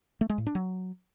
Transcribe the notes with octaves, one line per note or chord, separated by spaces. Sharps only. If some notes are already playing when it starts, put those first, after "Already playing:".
A3
G#3
A2
D4
F#3